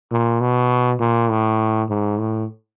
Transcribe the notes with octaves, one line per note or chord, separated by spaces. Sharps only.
A#2
B2
A#2
A2
G#2
A2